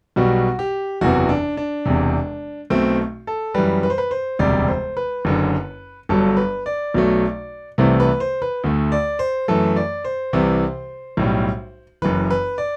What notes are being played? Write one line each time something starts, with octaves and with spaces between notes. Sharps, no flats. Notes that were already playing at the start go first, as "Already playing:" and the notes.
B1 B2 G3 F#4
G4
F#1 E2 C3 E3 F#4
D4
D4
E1 E2 C3
B1 B2 A3 C4
A4
F#2 E3 G3 B4
B4
C5
B4
C5
E1 D2 C3 G3 D5
C5
B4
F#1 F#2 D3
G1 G2 F#3 A4
B4
D5
B1 B2 F#3 A3
C2 C3 E3 A3 C5
B4
C5
B4
D2 D3 A3
D5
C5
F#2 E3 A3 A4
D5
C5
C2 C3 E3
B1 A2 G3
F#1 F#2 E3 B4
B4
D5